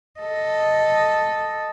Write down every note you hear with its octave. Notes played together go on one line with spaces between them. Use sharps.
A4 D#5